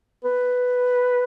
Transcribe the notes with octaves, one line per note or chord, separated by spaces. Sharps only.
B4